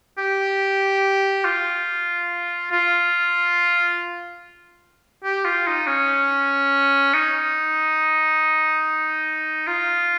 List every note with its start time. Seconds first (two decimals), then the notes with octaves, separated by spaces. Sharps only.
0.18 G4
1.45 F4
2.71 F4
5.24 G4
5.45 F4
5.67 D#4
5.87 C#4
7.14 D#4
9.67 F4